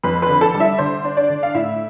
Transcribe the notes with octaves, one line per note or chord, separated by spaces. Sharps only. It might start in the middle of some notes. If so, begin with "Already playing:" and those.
F2 B4 B5
B4 B5
D3
A4 A5
G3
E4 E5
D3 C5
D4
D4 D5
D3
F5
A2 E4 E5